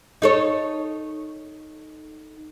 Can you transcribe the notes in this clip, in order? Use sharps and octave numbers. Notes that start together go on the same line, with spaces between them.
D#4 A4 C#5